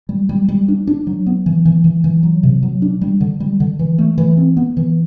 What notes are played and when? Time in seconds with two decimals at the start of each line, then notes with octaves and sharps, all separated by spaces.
0.09 G3
0.29 G3
0.49 G3
0.68 D4
0.87 D4
1.07 F#3
1.26 B3
1.46 E3
1.65 E3
1.84 E3
2.04 E3
2.23 F#3
2.43 C3
2.63 F#3
2.82 D4
3.01 G3
3.21 D3
3.40 G3
3.60 D3
3.79 E3
3.98 A3
4.18 E3
4.37 C4
4.57 B3
4.77 E3